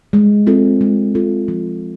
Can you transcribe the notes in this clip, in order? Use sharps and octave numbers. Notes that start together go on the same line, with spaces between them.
G#3
C4 F4 A4
G#3
C4 F4 A4
F3